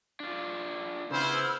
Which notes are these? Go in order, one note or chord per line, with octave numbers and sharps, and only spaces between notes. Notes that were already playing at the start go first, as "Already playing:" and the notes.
D4 F4
C#3 B3 E4 C5 E6 F6